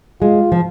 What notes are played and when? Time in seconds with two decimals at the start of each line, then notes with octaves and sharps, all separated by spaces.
0.21 G#3 F4
0.52 F3